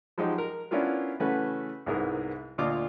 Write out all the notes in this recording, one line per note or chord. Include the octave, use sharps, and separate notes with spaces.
F3 F#3 G#3 D#4 G4
A#4
B3 C#4 D4 E4 F4 A#4
C#3 E3 A3 C#4 F#4 B4
C2 G#2 B3 E4 G#4 A#4
D2 A#2 F4 D#5 D6 F6